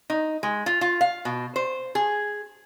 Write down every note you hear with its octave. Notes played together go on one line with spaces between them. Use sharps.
D#4
G#3
F4
F4
F5
B2
C5
G#4